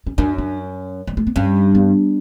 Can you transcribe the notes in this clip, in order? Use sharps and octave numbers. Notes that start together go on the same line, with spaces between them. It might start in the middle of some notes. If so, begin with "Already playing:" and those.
C#4
F#2 D4
D4
G3
A3
B3
G2 C#4
B3